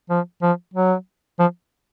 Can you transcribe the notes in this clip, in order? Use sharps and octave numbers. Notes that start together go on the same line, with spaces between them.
F3
F3
F#3
F3